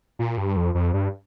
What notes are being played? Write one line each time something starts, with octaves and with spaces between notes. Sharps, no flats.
A#2
G2
F2
F2
G2